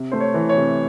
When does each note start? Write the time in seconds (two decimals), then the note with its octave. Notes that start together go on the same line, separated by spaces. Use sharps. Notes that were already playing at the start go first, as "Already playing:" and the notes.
Already playing: C3
0.12 A3 C5
0.20 C#5
0.34 E3
0.49 C#5
0.57 C3